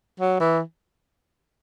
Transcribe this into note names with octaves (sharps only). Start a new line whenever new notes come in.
F#3
E3